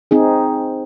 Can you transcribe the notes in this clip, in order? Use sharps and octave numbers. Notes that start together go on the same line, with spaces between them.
C4 D#4 G#4